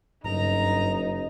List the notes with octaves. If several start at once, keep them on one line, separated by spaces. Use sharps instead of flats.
F#1 G2 D#4 A#5